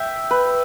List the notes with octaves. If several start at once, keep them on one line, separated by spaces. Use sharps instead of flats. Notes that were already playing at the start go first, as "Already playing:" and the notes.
Already playing: E5 G5
B4